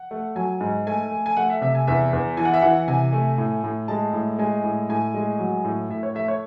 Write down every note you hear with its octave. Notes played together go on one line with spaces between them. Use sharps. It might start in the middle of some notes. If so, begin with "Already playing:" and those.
Already playing: F#5
A3
F#3 G#5
G#2
A3 G#5
A3
G#5
A3 F#5
E5
C3 E5
G#5
E2 E5
E2
E3 G#5
F#5
E5
E3 F#5
C3 G#5
A3
A2
A2
G#3 A5
A2
G#3 G#5
A2
A2 G#5
G#3
F#3
A2
A2 E5
C#5
A3 E5
C#5